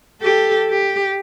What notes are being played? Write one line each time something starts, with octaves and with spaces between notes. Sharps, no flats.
G4 A4
G4